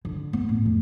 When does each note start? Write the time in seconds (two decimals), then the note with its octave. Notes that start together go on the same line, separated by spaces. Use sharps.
0.05 D3
0.33 B3
0.49 A2
0.66 F2